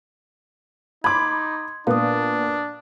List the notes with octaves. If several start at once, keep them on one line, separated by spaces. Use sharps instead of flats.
D#4 B5 C6 D6 G#6
A#2 B3 D4 F5 D#6